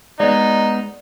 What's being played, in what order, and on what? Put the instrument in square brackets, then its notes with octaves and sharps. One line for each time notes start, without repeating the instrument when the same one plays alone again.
[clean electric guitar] G#3 B3 [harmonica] D#4 [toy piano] D5